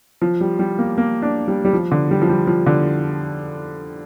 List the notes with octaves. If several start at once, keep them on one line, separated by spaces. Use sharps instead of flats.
F3
G3
G3
A#3
A#3
D4
G3
G3
F3
D3
G3
F3
G3
F3
D3